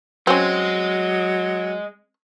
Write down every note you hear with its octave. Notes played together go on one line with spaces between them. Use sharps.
F#3 G#3 C4 C#4